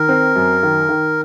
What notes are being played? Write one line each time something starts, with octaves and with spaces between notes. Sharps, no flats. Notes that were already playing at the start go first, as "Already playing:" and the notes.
Already playing: D#3 A#4
C4
F#2
D#3
D#3